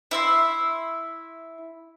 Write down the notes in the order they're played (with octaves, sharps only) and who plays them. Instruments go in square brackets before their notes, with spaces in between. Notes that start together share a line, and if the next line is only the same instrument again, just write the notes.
[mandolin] E4 E5 C6